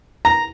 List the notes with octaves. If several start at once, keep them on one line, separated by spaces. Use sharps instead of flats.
A#5